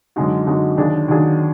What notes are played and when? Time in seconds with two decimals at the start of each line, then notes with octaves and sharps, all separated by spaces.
0.16 F#2 D3 G#3 D#4 F#4
0.47 F#2 D3 G#3 D#4 F#4
0.77 D#2 D#3 F#3 D4 G#4
1.08 D#2 D#3 F#3 D4 G#4